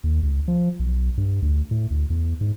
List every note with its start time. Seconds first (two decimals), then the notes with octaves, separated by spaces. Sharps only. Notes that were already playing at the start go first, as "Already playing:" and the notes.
0.04 D#2
0.23 C#2
0.48 F3
0.79 B1
1.17 G2
1.42 D2
1.71 A2
1.90 D2
2.10 E2
2.41 G#2